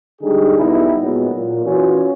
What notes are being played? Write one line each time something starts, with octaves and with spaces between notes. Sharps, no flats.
D3 G3 G#3 D#4 G#4
B1 G3 B3 D#4 E4
A#2 F#3 G#3 B3
A#2
E3 C#4 F4 F#4